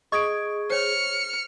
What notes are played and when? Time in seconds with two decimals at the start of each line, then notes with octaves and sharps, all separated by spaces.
0.12 G#4 D#5 C#6 D#6 G#6 D7
0.70 C5 C#5 F6 C#7